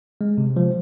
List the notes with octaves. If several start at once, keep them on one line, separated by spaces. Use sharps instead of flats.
G#3
C3
F3